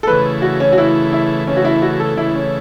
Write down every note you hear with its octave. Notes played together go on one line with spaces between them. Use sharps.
A4
C#3 E3 A3 B4
F#4
C#4
F#4
C#3 E3 A3 E4
E4
C#3 E3 A3 C#4
F#4
E4
F#4
A4
C#3 E3 A3 E4
C#4